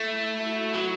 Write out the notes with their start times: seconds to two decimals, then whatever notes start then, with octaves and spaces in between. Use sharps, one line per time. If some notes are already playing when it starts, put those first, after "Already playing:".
Already playing: A3 E4
0.33 F#4
0.75 F#3